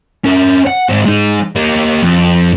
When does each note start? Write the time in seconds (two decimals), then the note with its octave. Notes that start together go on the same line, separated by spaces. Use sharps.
0.25 C#4 A#4
0.67 F#5
0.89 G#2 C4
1.05 G#3 D#4
1.56 A#3 G4
2.02 F2